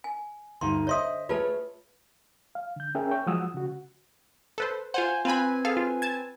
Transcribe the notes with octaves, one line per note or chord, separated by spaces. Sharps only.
G#5
D2 G2 D#4 C6
C5 C#5 D#5 E5 C6 D#6
A3 F4 G#4 B4 C#5 A5
F5
D3 G6
C#4 G#4 A#4 E5 G5
C#5 G5 C#6
F3 F#3 G#3 F#5 D#6 E6
C#3 F#4
A4 B4 C5
F4 C5 F#5 G#5
C4 F4 B4 G#5 B5
G#4 A4 F5
F4
A5 G#6